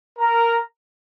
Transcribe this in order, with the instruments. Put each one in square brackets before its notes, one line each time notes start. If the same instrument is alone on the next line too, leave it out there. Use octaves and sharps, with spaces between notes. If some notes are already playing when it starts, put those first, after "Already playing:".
[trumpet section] A#4 A#5